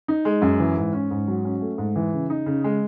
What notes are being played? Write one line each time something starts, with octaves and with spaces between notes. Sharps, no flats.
D#4
G#3
F#2
E3
G#2
C#4
G#2
F#3
C#4
A3
G#2
E3
C#3
D#4
C#3
G#3